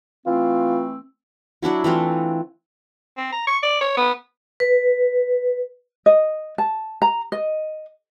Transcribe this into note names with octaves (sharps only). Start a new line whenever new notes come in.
E3 A3 C4 F4
F#3 D4 E4 F#4
E3 A3 C4 F4
C4
A#5
C#6
D5
C#5
B3
B4
D#5
A5
A#5
D#5